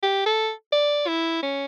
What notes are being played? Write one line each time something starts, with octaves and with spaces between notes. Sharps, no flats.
G4
A4
D5
E4
C#4